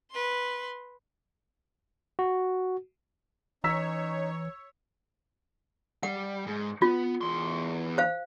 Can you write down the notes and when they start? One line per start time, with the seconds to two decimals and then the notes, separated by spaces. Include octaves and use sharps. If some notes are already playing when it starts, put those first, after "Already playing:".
0.11 B4 C6
2.19 F#4
3.64 E3 C#4 D#4 C#5 A#5 E6 B6
6.03 G3 F#5
6.47 G#2
6.82 B3 F4
7.21 E2 C6
7.98 C5 F5